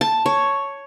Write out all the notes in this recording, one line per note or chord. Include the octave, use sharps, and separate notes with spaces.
A5
C#5